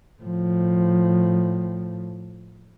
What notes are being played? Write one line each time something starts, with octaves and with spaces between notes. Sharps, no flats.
A2 F3